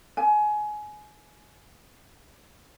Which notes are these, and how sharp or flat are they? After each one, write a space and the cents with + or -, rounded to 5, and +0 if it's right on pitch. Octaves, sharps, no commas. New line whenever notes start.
G#5 +25